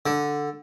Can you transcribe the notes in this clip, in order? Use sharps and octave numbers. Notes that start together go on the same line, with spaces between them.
D3